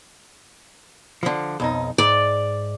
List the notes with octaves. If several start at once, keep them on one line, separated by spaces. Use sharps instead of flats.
D3 F3
B1 F2 D#4
G#2 D5